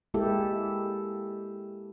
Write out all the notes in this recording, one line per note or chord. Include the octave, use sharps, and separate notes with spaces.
G#3 A#3 E4 G4 A4